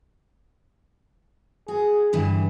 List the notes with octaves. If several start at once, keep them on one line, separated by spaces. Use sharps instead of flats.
F#4 G#4
G2 D3 E3